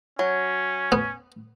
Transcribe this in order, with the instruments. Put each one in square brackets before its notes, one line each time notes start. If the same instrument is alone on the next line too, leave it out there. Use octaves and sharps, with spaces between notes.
[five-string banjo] F#3 [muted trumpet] C#4
[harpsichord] B3